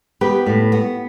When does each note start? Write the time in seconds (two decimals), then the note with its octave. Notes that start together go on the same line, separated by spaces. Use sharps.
0.21 B3 G4 B4
0.46 A2
0.72 B3